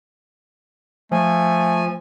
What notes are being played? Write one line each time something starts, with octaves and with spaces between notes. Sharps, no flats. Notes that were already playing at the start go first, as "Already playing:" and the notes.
F3 A3 G#5